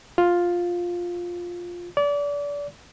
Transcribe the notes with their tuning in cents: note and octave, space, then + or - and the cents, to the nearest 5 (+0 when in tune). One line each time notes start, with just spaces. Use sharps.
F4 +5
D5 -30